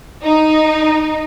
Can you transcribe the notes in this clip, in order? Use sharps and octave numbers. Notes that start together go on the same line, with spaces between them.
D#4